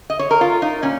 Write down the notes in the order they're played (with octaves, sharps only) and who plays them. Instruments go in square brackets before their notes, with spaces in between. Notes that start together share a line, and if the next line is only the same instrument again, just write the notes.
[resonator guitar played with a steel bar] D#5
C#5
A#4
F4
D#4
A#2 C#4